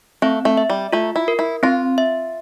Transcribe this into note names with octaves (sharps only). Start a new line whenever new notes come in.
A3 C4
A3
E5
G3
A3 F4
E4
A#4
E4
C4 F4
E5